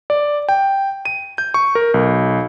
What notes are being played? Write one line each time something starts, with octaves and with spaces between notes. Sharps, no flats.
D5
G5
D#7
G6
C#6
A#4
B1